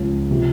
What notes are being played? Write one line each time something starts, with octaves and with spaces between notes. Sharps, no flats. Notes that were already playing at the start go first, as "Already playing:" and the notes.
Already playing: C#2 C#3 F3 G#3 C#4
C3 F3